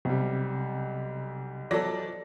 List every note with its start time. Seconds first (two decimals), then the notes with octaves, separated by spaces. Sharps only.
0.05 B1 C3 G3
1.71 F3 F#3 A4 D5 A#6